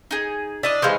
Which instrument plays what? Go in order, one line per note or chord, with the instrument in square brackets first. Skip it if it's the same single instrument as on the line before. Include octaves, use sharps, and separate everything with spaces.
[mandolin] D#4 G#4
[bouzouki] D4 [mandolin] E4 D#5 D#6
[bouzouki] E3 G#3 [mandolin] C5 C#5 F5